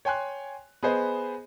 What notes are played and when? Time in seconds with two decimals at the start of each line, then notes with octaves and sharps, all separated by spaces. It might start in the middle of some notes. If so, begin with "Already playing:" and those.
0.05 C#5 G5 G#5 C6 F#6
0.83 B3 G#4 B4 C5 D#5